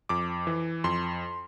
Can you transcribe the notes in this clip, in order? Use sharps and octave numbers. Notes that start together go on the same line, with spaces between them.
F2 D6
E3
F2 C6